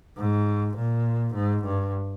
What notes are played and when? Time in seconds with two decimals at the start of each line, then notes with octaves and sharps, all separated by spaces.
0.18 G#2
0.77 A#2
1.35 G#2
1.65 G2